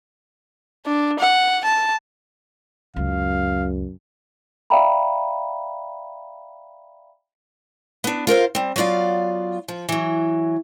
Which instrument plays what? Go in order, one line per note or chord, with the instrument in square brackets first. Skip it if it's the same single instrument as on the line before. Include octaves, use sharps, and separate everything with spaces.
[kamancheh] D4
F#5
A5
[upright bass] C#2 [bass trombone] F#2 [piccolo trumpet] F5
[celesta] D5 E5 F5 G5 A#5 B5
[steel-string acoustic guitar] B3 D4
F4 A#4 C5 F5
G3 C4
F#3 B3 F4 D5 F5
F3
E3 F#3